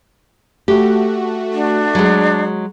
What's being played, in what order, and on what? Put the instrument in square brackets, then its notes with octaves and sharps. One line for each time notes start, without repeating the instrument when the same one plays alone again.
[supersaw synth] A3 F#4 [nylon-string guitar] G4
[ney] D4
[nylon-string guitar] F#3 G#3